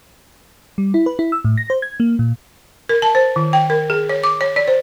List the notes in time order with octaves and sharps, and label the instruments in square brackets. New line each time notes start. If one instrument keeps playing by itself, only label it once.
[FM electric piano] G3
E4
B4
E4
E6
A2
A#6
C5
G#6
A#3
A#2
[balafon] A#4
A5
C5
D#3
G5
A#4
G#4
C#5
D6
C#5
D5
C5